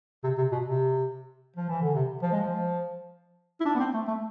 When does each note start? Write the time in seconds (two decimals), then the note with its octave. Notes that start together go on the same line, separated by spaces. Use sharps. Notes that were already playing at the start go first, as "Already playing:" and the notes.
0.24 C3
0.38 C3
0.52 B2
0.66 C3
1.57 F3
1.69 E3
1.82 D3
1.94 C3
2.22 F3
2.32 G#3
2.41 F3
3.61 E4
3.66 D4
3.75 B3
3.79 C4
3.94 A3
4.08 A3